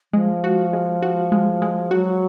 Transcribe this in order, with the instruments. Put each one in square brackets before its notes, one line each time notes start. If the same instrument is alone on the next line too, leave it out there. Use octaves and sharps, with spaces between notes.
[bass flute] F3 [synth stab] G#3
[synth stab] F#4
G#3
F#4
G#3
G#3
[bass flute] F#3 [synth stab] F#4